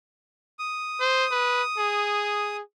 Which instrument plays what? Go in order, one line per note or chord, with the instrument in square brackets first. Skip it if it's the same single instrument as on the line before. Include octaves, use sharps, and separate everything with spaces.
[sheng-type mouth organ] D#6
[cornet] C5
B4
G#4